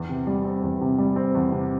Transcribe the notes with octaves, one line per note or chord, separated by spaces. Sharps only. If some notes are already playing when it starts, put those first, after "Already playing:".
Already playing: E2
C3
G3
C4
E2
C3
G3
C4
E2
C3